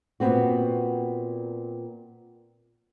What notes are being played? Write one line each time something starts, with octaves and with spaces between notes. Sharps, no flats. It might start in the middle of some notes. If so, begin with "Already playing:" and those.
A#2 B3 C4 F#4